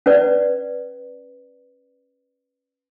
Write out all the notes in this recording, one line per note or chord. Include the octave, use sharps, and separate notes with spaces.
C#4 B4 D5